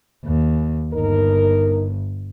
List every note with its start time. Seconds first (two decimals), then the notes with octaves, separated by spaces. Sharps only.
0.25 D#2
0.93 G1 D#4 A#4